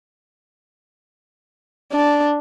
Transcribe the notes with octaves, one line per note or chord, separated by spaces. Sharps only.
D4